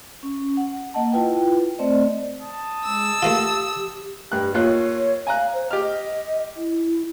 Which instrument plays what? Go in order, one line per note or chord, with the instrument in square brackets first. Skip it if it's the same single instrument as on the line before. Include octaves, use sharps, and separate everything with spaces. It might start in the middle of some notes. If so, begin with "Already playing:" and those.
[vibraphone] C#4
F#5
A#3 D#5 F#5 A5
E4 F4 B4 G5
A3 C4 C5 D5 D#5
[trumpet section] A5 D#6
[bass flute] G#3 [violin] E6
[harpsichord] A3 A#3 F4 [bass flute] G4
[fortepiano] G2 F#6 [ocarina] G4
[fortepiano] D#2 F4 F#6 [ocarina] C#5
[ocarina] F5 [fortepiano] G#5 A#5 F#6
[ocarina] C5
[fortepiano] G4 F6 [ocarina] D#5
[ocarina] E4